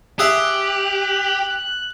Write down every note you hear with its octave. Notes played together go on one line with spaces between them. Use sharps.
G4 G#4 E5 F#6